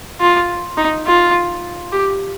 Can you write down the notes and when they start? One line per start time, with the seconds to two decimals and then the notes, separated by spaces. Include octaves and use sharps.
0.20 F4
0.77 D#4
1.06 F4
1.92 G4